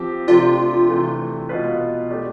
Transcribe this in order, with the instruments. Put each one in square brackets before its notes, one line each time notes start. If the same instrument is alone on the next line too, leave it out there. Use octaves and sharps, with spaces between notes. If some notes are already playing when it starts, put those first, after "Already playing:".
Already playing: [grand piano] F3 C4 G4
[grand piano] C3 F3 A3 D4 G4 [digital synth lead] F4
[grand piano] C3 E3 A3
B2 B3 F4 B4
A3 D4 G4